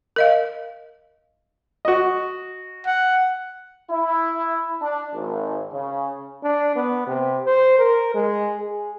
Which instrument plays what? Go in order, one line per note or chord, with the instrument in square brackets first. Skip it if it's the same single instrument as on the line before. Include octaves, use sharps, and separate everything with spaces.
[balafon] A#4 D#5 F5
[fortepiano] F#4 D#5
[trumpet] F#5
[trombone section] E4
D4
G#1
C#3
[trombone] D4
B3
C3
C5
A#4
G#3
G#4